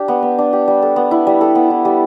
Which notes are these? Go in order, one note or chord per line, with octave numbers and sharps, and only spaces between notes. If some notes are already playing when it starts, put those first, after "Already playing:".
Already playing: D4 G4
B3
B3
D4
G4
G3
A4
B3
E4
G3
A4
B3
E4
G3